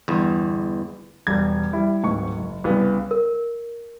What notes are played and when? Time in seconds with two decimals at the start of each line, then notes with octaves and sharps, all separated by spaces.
0.08 G1 E2
1.27 E1 G3 G#6
1.73 G3 E4
2.03 D1 G#2 C#6
2.37 F#1
2.64 C2 C#3 B3
3.11 A#4